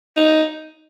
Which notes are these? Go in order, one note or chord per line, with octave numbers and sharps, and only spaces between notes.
D#4